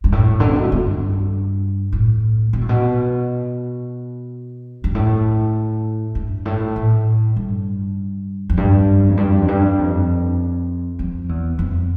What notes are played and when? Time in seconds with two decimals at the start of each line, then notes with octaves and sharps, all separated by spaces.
0.04 G2
0.12 A2
0.40 D3
0.48 C3
0.55 B2
0.64 A2
0.72 G2
1.92 A2
2.53 B2
2.61 A2
2.69 B2
4.84 G2
4.95 A2
6.15 G2
6.45 A2
6.76 A2
7.36 G2
8.50 F2
8.57 G2
9.09 F2
9.17 G2
9.41 F2
9.48 G2
9.78 F2
10.99 F2
11.29 E2
11.59 F2